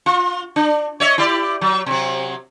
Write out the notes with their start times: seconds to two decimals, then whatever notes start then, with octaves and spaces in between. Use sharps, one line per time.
0.06 F4
0.56 D4
1.00 C#5 D#5 E5
1.18 E4 G4 D5
1.61 F#3
1.86 C3 F#3